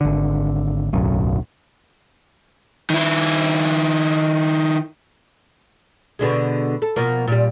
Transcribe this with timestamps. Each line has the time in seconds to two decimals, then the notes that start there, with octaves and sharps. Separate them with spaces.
0.01 G#1 D3
0.93 D1 B1 F#2
2.90 D#3 E4
6.19 B2 D3 G#3
6.82 A4
6.96 B2 F3 A#3
7.28 A#2 G3